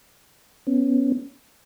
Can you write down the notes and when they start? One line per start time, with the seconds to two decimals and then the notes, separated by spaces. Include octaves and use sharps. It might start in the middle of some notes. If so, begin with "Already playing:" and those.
0.67 B3 C#4